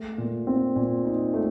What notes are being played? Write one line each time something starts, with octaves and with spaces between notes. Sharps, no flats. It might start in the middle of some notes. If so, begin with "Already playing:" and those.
Already playing: A3
A#2
C4
A#2
D#4
A3